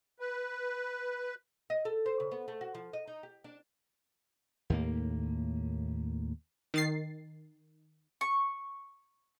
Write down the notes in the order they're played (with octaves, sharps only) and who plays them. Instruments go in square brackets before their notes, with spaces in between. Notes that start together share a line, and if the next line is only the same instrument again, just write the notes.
[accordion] B4
[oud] D#5
A4
C5
C#3
B3
A3
F#4
F3
D#5
D#4
G4
D4
[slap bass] D#2 A2 A#3
[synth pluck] D#3 A6 C7
[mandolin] C#6